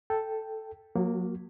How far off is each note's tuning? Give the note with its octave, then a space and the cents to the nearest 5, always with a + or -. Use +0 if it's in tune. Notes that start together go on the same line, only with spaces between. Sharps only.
A4 +0 G5 +0
F#3 -35 A#3 +0 F#4 +25